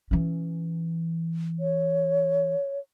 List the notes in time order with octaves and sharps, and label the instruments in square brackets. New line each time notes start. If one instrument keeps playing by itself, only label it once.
[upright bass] E3 C#4
[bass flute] C#5